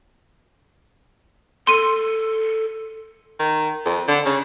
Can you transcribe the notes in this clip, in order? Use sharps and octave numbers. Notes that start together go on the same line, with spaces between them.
A4 C6 D#7
D#3
F2
D3
C#3